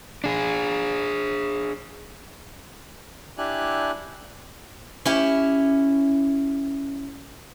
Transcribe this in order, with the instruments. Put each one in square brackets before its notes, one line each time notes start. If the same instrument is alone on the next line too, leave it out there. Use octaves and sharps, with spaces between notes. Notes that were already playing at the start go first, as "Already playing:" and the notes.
[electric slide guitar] D4 G#4
[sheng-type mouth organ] D4 E4 G4 G#5 F#6
[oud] C#4 E4 G4